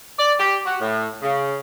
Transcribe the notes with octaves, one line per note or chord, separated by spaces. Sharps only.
D5
G4
F#4
A2
C#3